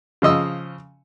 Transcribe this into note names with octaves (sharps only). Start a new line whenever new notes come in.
C#3 F3 D#5 E6